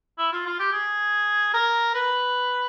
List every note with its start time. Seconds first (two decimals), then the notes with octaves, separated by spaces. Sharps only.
0.18 E4
0.32 F4
0.46 F4
0.59 G4
0.72 G#4
1.54 A#4
1.94 B4